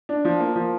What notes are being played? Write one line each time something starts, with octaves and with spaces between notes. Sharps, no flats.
D4
F3
A#3
F3